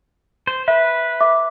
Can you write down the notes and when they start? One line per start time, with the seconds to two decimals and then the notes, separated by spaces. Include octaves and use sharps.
0.47 C5
0.68 B4 E5
1.21 E5 D6